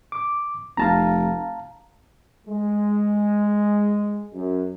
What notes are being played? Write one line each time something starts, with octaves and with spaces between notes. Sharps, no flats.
D6
F1 F5 A5 A#5
G#3
F#2